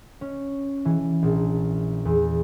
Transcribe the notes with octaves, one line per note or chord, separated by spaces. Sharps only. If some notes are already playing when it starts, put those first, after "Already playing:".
C#4
E3
A#1
E2